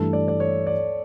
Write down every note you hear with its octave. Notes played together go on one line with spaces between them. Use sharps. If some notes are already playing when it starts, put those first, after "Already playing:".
Already playing: G2 E3 A3 A4
D5
D5
C#5
D5